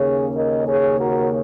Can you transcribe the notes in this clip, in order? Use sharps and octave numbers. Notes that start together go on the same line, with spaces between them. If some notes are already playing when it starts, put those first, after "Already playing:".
Already playing: D#2 C#3 A#3 C#4 G#4 C#5
A#4 D#5
G#4 C#5
F#4 A#4